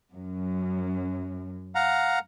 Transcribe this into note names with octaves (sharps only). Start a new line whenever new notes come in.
F#2
F5 F#5 A#5